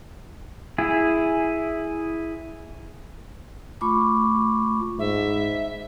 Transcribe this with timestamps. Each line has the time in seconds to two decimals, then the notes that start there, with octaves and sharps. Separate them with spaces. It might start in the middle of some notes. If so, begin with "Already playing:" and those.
0.78 E4 G#4
3.81 A3 F4 B5 C#6 D6
4.99 G#2 E5